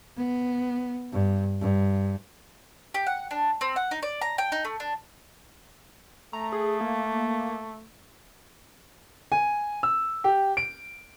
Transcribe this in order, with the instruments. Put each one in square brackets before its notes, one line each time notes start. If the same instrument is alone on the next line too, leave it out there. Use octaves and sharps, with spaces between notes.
[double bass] B3
G2
G2
[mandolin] G4
F#5
D4
C4
F#5
D#4
D5
A#5
G5
D#4
A3
D4
[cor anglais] A3 [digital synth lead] A#5
[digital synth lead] G#4
A#3
[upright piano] G#5
E6
G4
D7